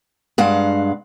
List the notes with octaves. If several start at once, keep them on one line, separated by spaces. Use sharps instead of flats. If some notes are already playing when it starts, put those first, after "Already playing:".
G2 G#3 F5 F#5